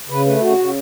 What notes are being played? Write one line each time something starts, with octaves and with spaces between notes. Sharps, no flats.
C#3 B4
A3 B4
E4
C#3 F#4
C#3